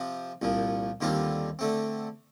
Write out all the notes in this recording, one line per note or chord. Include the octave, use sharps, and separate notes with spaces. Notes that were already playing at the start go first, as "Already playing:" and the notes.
Already playing: C3 F3 C4
C2 A#2 F3
D#2 D3 G3 C4 F4
D3 A3 C4